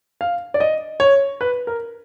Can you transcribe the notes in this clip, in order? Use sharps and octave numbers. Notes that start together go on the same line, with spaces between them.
F5
D5
D#5
C#5
B4
A#4